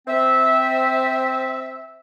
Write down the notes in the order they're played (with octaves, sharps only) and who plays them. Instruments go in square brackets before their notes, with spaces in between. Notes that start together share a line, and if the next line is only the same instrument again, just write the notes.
[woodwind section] C4 E5